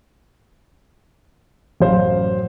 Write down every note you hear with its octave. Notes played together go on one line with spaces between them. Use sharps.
A1 F#2 C5 F5